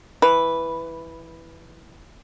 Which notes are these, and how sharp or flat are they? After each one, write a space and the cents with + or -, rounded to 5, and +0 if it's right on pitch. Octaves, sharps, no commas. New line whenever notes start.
E3 +0 B4 +0